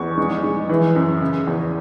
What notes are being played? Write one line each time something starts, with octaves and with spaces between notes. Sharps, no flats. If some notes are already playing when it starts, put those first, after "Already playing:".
Already playing: E2 C#6
G#3
G#3
E3
F#2
C#3
E2